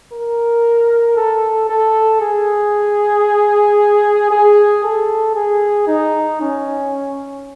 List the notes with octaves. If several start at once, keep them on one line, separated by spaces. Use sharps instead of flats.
A#4
A4
A4
G#4
G#4
A4
G#4
D#4
C#4